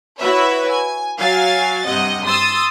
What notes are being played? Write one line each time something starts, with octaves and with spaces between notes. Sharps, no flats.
E4 F#4 B4 C#5 E5
G#5
F#3 F5 G#5 A6
G2 C3 D#5 F#5
C6 D#6 E6 A6